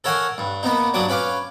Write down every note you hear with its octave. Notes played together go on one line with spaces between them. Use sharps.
A4 A#4 C#5 F5 F#5 G#5
G2
A#3 B3 D#4
G2 F#3 D4 D6 D#6
C#4 B4 F5 D6